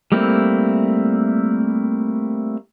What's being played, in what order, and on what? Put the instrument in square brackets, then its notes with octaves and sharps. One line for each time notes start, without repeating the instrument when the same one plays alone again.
[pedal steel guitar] G3 A3 A#3 C4 E4